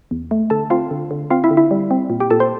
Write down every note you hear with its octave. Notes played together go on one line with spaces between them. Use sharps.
E2
A3
D3 A4 A5
C4 F4 F5
D3
D3
C4 F4 F5
E4 E5
D3
E4 E5
G3
C4
A#2
G4 G5
A#2 A4 A5
C5 C6